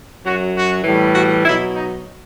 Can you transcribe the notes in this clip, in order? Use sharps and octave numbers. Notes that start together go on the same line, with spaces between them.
F#2 F#3 F#4
F#4
A2 E3 G3
F#4
B2 F#3 E4
D#4